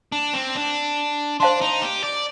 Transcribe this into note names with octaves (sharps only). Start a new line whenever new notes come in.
D4
C4
D4
D4 C5 F5 A5 C6
D#4
G4
D5